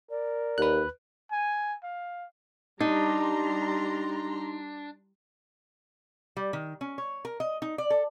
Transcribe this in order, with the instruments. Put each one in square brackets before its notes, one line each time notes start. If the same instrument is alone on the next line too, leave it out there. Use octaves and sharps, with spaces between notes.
[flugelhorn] A#4 [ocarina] D5
[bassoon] D#2 [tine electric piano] B4 F#6
[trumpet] G#5
F5
[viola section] G3 A#5 C6 [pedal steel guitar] D4 [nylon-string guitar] D#4
[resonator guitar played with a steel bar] G3
D#3
C#4
C#5
A#4
D#5
D#4
D5
A4